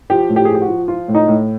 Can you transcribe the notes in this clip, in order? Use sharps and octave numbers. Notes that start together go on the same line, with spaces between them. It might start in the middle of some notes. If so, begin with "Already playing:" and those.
F3 G4
A2
G4
G#4
F3
G4
F#4
F3
F3 F4
A2
D#4
A2